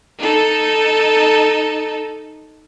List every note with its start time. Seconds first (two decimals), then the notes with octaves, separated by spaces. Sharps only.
0.18 D#4 A4